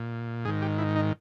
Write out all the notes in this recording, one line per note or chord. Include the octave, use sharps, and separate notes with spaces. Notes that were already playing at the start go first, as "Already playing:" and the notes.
Already playing: A#2
G#2 D#3 G#4
G4
E4
D#4